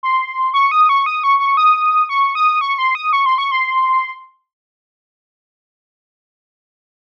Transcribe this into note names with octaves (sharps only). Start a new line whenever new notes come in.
C6
C#6
D#6
C#6
D#6
C#6
C#6
D#6
C#6
D#6
C#6
C6
D#6
C#6
C6
C#6
C6